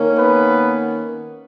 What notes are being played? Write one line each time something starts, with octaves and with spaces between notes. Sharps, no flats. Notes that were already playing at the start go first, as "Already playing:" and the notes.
Already playing: D#3 A#3 C#4
B3 B4